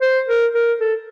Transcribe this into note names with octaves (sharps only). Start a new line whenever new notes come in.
C5
A#4
A#4
A4